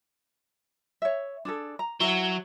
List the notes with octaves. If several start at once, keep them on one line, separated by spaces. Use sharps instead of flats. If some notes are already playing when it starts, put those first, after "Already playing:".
C#5 E5
D4 G#4 A4
A#5
F#3 E4 F#5